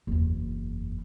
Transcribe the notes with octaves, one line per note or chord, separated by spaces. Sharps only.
F#1 E2